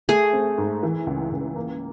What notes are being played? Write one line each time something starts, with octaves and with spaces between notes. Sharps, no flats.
A3 G#4
C4
G#2
E3
C#2
C#2
A#3